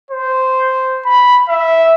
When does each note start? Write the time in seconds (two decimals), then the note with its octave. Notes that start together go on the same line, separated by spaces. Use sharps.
0.11 C5
1.06 B5
1.49 E5